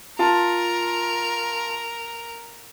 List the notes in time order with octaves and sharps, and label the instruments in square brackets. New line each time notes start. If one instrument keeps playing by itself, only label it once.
[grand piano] F4 A5 [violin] A#4